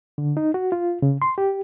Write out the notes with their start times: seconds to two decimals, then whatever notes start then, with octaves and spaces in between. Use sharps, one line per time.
0.18 D3
0.37 D#4
0.54 F#4
0.72 F4
1.02 C#3
1.22 C6
1.38 G4